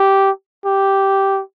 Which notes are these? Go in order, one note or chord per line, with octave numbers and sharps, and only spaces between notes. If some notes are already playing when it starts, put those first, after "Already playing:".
Already playing: G4
G4